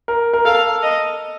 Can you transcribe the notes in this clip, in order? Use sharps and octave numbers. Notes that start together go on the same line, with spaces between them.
A#4
A#4
A4 F5
D#5